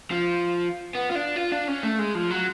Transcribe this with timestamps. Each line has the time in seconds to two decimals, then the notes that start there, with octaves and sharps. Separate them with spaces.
0.11 F3
0.95 B3
1.11 F4
1.15 D4
1.36 F4
1.52 D4
1.68 C#4
1.83 A3
1.99 G#3
2.15 F3
2.30 F#3